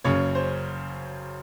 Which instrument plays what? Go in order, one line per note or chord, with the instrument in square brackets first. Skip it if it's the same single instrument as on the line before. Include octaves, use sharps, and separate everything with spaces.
[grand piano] F#1 F#2 C#3 F#3 C#5
C5